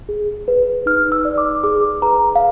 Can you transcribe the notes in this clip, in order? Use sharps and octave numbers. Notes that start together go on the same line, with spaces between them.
G#4
B4
D#4 F6
E6
D5
D6
G#4 D6
B4 A#5
F5